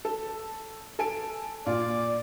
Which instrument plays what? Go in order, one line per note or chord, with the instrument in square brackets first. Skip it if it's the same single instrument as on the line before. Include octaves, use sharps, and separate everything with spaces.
[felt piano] A4
A4 G#5 D7
[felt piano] A#2 F4 [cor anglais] D5